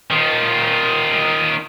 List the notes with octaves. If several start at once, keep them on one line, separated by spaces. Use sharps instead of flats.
D#3 F4